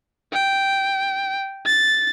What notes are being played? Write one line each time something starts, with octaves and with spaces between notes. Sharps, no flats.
G5
A6